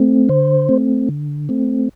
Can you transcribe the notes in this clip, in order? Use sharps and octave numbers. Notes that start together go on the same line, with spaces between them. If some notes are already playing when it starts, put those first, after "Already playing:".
Already playing: A3 C4
D3 C5
A3 C4
D3
A3 C4